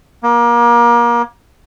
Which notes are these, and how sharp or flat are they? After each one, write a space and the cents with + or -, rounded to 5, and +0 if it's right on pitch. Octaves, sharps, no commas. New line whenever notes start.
A#3 +30